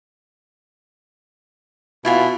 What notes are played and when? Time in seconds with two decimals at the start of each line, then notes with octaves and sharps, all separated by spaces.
2.05 B2 E4 F4 G#5